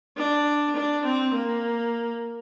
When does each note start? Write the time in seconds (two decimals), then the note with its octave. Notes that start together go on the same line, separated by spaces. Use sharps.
0.17 D4
0.76 D4
1.04 C4
1.33 A#3